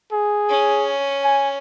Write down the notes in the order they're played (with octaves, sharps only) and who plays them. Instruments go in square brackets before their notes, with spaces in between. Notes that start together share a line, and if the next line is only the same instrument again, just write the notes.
[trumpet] G#4
[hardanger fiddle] C#4
[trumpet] G#5